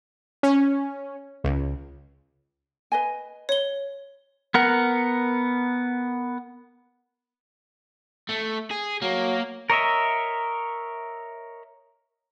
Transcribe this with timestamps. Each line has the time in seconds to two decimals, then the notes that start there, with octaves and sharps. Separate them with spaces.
0.43 C#4
1.44 C#2
2.92 B4 D#5 G#5
3.49 C#5 G7
4.54 B3 A#4 F#5
8.29 A3
8.71 G#4
9.02 F#3 A#3
9.70 A#4 C#5 D#5 E5